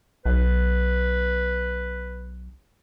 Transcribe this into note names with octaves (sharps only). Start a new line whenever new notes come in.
B1 B4